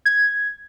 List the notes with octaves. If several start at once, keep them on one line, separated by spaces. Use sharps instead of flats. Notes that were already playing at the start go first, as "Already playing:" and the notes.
G#6